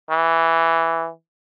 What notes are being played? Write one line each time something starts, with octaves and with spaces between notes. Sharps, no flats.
E3